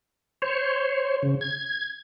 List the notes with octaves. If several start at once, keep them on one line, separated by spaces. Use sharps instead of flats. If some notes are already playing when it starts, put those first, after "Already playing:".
C5 C#5
C#3
G#6